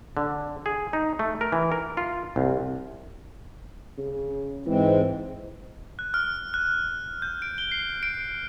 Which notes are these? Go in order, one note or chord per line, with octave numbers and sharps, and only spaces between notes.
D3
G#4
D#4
A3
A#4
E3
A#4
F4
C2
C#3
G#2 E3 G#3 C4
F#6
F6
F#6
G6
D7
G7
C7
D7